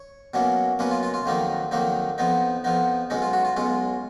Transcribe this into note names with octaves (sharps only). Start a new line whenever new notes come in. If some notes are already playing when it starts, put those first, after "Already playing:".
Already playing: C#5
B2 F#3 A#3 C#4
B2 F#3 A#3 C#4 B4
F4
F4
F4
F2 D#3 F#3 A#3 D#4
F2 D#3 F#3 A#3 D#4
F2 F3 B3 D#4
F2 F3 B3 D#4
B1 B2 G#3 C#4 D#4
F4
F#4
F4
B1 B2 G#3 C#4 F4